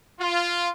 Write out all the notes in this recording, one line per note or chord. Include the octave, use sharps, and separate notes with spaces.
F4